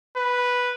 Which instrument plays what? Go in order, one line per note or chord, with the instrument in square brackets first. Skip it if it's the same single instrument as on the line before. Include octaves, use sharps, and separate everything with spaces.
[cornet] B4